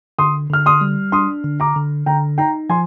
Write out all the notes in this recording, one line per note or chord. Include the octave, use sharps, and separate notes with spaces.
D3 C6 D#6
D3 F6
C6 D#6
G3
D4 C6 D#6
D3
A#5 D6
D3
D3 G5 A#5
D#4 G5 A#5
F3 G#5 C6